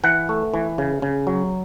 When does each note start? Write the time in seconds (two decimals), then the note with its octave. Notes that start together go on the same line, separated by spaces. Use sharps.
0.04 E3 F#5
0.29 A3
0.54 E3
0.78 C#3
1.02 C#3
1.27 F#3